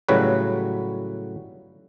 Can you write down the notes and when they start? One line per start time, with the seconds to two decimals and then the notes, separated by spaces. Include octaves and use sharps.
0.09 A2 C#3 F#3 G3 F#4 B4